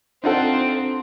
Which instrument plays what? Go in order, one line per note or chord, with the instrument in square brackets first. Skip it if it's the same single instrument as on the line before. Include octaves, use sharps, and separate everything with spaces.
[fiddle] C4 [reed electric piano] D4 A4 [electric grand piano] D#4 F4 F#5